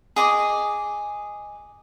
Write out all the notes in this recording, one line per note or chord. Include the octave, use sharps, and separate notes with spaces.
G#4 D#5 D6